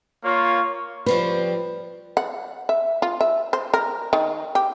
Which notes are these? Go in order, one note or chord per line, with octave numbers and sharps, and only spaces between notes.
A#3 F4 C#5 C#6
F3 G3 C4 B4
F#5
E5
F4
E5
C5
A#4
D#3
G4